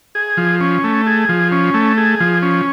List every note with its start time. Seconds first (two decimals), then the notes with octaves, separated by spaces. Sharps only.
0.15 G#4
0.37 F3
0.61 C#4
0.84 A3
1.07 G#4
1.29 F3
1.52 C#4
1.74 A3
1.97 G#4
2.20 F3
2.42 C#4